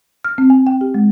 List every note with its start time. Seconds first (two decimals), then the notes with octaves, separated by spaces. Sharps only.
0.24 F6
0.38 C4
0.50 G#5
0.67 G5
0.81 G4
0.94 G#3